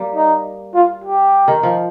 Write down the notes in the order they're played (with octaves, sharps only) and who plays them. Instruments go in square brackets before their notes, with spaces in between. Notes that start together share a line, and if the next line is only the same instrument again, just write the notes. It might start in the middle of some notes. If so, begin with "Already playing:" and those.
Already playing: [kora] G3 A#3
[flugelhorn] D#4
F4
G4
[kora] D#3
F3